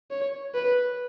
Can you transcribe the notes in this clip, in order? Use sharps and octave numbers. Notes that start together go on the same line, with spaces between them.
C#5
B4